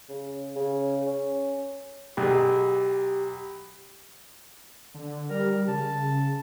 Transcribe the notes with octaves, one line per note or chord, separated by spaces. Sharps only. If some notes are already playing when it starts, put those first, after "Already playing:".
C#3
C#3
C#4
B1 G4 G#4
D3
G3 A#4
C#3 A5